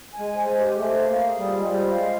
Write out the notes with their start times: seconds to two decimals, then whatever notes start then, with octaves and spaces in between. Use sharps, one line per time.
0.12 G#5
0.19 G#3
0.35 C5
0.50 G#3
0.57 G4
0.78 A3 C5
1.01 F5
1.09 A#3
1.24 G#4
1.38 G3
1.46 F4
1.58 G#3
1.68 G3 C5
1.91 F5
1.98 G#3